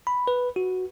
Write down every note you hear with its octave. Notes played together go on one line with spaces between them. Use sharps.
B5
B4
F#4